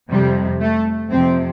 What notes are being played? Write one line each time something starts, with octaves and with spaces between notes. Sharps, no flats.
F2 C3 F3 G3
A3
F2 C3 F3 C4